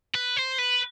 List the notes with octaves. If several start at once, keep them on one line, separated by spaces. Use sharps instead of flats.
B4
C5
B4